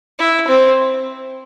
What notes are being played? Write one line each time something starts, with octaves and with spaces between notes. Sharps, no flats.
E4
C4